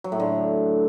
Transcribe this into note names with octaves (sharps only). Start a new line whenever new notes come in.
F#3
A2
D3